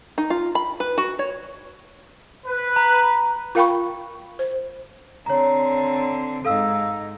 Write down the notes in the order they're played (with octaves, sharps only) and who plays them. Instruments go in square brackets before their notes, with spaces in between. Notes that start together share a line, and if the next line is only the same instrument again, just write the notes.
[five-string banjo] D#4
F4
B5
B4
F#4
C#5
[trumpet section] B4
[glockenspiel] A#5
[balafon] F4 A#4 F5 G5 B5 C#6
C5
[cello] D3 C4 [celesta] C#5 A#5
[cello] G#2 D#4 [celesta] A4 F5 E6